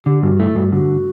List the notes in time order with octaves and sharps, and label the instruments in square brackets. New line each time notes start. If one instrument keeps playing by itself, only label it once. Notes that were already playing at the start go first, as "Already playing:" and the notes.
[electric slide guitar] D3 [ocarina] G4
[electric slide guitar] G2 [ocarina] F#4
[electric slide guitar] A3 [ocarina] E4
[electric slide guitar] G2 [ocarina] F#4
[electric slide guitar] D3 [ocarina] F#4